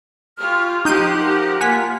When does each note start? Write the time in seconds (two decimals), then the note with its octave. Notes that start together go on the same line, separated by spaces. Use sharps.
0.38 F4 G4 C#6 F6
0.85 F3 D#4 G4 F#5 C6 G6 D#7
1.19 A#4
1.61 A#3 F4 F#5 G#5 B6